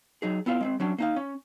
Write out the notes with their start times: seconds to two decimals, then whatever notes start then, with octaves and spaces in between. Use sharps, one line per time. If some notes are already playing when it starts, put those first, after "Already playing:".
0.22 F#3 D#4 G#4
0.46 B3 E4 F4 D#5 F5
0.61 G#3 A#3 C4
0.80 F#3 C#4 D4
0.98 A#3 D#4 F5
1.16 C#4